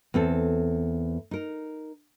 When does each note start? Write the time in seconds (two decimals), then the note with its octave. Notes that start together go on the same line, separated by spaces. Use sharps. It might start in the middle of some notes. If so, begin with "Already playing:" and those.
0.14 E2 C4 A4
1.31 D#4 A#4